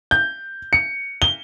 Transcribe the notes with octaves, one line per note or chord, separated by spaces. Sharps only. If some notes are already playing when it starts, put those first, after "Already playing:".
G6
C#7
G7